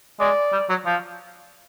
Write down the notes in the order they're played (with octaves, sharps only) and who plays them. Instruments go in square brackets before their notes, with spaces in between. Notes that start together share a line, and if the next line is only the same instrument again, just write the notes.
[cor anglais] G#3 [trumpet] D5
[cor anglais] G3
F#3
F3